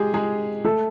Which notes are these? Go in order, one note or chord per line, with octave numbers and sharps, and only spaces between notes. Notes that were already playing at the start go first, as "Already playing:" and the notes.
Already playing: G#3 G4 G#4
G#3 G#4
A3 A4